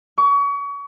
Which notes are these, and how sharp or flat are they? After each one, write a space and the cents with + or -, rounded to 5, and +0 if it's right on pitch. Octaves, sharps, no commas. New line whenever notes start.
C#6 +35